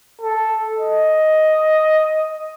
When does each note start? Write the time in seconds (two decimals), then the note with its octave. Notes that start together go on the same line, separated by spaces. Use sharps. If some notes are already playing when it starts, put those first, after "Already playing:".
0.22 A4
0.79 D#5